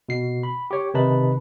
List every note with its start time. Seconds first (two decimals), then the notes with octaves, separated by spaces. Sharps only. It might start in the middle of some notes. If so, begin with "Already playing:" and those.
0.09 B2 C7
0.43 B5
0.71 G4 C#5
0.94 C3 D#3 D#4 B4 A5 B5